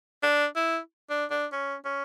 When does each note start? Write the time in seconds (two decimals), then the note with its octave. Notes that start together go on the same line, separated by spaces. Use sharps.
0.23 D4
0.56 E4
1.10 D4
1.31 D4
1.52 C#4
1.85 C#4